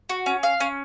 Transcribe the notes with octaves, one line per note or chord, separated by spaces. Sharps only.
F#4
C#4
F5
C#4